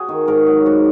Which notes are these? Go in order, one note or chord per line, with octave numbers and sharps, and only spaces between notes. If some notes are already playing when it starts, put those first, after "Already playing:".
Already playing: F#4 G#4
D#3
G#2 A#4
F#3
G#2 F#4